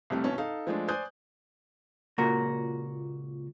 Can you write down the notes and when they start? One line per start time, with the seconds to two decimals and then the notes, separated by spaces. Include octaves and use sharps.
0.10 C2 F2 G3 A3
0.24 G#1 B2 C#4 A5
0.38 D#4 A4 F5
0.67 F3 G#3 A3 D4
0.88 C5 D5 G#5 D#6 F#6 G6
2.18 C#2 A#2 F#4 A#4